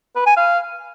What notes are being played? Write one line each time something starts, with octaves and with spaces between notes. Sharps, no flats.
B4
G#5
F5